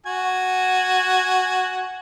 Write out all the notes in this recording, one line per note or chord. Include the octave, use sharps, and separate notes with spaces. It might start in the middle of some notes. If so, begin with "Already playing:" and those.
F#4 G#5